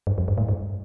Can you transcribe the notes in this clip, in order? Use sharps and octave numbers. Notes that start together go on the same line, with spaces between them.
G2
F2
G2
A2
G2